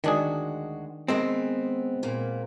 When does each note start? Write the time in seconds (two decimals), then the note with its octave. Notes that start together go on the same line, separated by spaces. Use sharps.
0.04 D2 D#3 G#3 D4 F#4 G#4
1.08 G#3 B3 C4 A#4
2.02 A#2 A#3 B3